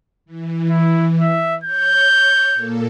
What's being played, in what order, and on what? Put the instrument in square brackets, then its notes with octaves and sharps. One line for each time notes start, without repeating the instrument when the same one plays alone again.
[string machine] E3
[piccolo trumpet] E4
E5
[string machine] C#5 [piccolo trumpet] G6
[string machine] A#2 A#3 A4